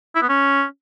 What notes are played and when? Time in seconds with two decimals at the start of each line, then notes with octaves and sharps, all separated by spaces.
0.15 E4
0.22 B3
0.29 C#4